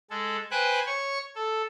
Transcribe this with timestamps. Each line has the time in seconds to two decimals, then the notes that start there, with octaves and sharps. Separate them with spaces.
0.10 G#3 A4
0.51 B4 C5 G5 G#5 F#6
0.86 C#5 C#6
1.35 A4